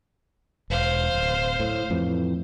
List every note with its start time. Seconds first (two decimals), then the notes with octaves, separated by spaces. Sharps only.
0.70 E1 C5 F5
1.15 D1
1.60 A2
1.90 F2 A2 E3